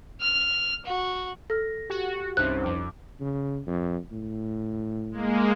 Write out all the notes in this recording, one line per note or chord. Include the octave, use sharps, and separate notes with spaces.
F6
F#4
A4 F6 A#6
F#4 G4
C2 G2 C3 C#4 D#4 C5 F#6
F2 D6
C#3
F2
A2
G#3 A#3